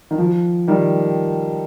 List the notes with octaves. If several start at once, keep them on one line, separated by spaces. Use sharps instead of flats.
D#3
F3
D#3 G3